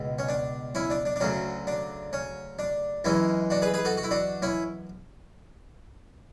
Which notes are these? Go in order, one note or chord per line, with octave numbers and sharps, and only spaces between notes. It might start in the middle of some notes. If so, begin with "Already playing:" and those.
Already playing: C#2 B2 G#3
C#4
D4
C#4 E4
D4
D4
D4
D2 C#3 F#3 C#4
D4
C#4
D4
F#2 E3 G#3 C#4 E4
D4 F#4
G#4 B4
G#4 B4
F#4 A4
F#4
E4
D4 F#4
C#4 E4